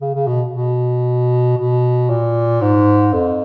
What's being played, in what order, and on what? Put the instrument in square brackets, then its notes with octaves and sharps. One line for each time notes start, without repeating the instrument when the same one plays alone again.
[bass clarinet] C#3
C#3
B2
B2
B2
A#2
G#2
F2